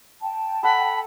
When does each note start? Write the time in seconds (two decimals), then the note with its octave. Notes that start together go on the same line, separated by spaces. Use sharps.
0.22 G5 A5
0.63 A4 F#5 G#5 B5